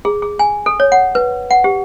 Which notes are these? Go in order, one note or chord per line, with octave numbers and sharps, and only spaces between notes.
G#4
G#4
G#5
A4
C#5
F#5
B4
F#5
G4